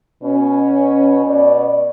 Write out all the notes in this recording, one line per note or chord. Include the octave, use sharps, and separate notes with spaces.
B2 C#4
B2 D5